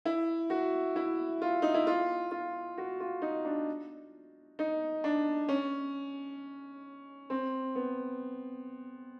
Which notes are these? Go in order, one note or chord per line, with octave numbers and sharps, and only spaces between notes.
E4
F#4
E4
F4
D#4
E4
F4
F4
F#4
F4
D#4
D4
D#4
D4
C#4
C4
B3